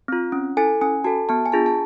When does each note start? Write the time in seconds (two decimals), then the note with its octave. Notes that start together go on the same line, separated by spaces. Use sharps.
0.08 C4 F4
0.32 C#4
0.57 E4 A4 G#5
0.81 C#4 G#5
1.04 F#4 A4 A5
1.29 B3 A5
1.46 G#5
1.52 D4 F4 G#4 A5
1.66 A5